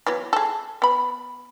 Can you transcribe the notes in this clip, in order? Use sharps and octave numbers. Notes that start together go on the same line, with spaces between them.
E3 F#3 B3
G#4 A4
B3 B5